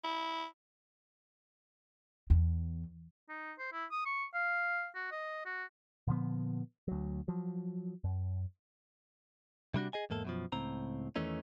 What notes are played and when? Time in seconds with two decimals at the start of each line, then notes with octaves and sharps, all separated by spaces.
0.04 E4
2.30 E2
3.29 D#4
3.59 C5
3.73 E4
3.92 D#6
4.06 C#6
4.34 F5
4.95 F#4
5.12 D#5
5.45 F#4
6.07 A#2 D3 F3 B3
6.88 D2 F#3
7.28 F3 F#3
8.04 F#2
9.74 C3 G3 D4 F#4
9.93 G#4 D#5 G#5
10.10 E2 G#2 A#3 A4
10.25 F#2 B2 F3
10.52 C#2 A2 C4 A#5
11.16 E2 D#3 E3 A3 C#4 D#4